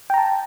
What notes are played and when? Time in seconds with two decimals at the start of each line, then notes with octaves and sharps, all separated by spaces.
0.10 G5
0.14 A#5
0.18 A5